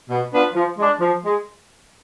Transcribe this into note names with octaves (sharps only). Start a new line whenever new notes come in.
B2
B3 D4 F4 B4
F3
G#3 D4
F3
G#3